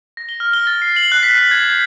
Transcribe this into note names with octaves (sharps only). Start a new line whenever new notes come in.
A#6
G7
F6
G7
A6
C7
F#7
F#6
B6
C7
G#6
G6